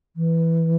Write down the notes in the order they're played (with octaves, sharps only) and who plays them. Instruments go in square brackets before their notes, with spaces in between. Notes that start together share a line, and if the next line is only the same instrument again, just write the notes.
[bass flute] E3